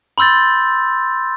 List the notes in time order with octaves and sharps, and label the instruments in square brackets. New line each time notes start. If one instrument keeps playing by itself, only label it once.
[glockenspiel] B5 C6 E6 G6 A6